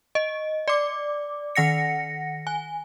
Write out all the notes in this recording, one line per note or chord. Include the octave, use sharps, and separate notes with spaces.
D#5
D5 D6
D#3 F#5 A#6 C#7
G#5